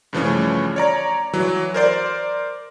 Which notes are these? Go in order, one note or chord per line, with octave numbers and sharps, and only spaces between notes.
G2 C#3 E3 F3 A3 C#4
C#5 D5 A#5
E3 F#3
A#4 C5 D5 C6